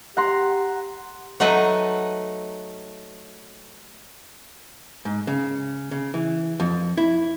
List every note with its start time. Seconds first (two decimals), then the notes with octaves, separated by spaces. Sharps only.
0.17 G4 F#5 A#5 C6
1.40 F#3 A3 D#4 B4 D#5
5.05 G#2
5.27 C#3
5.91 C#3
6.14 E3
6.60 F2
6.97 E4